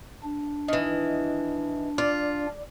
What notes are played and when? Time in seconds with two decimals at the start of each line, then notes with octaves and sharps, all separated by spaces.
0.23 D4
0.68 D#3 E3 D#5
1.98 F4 D5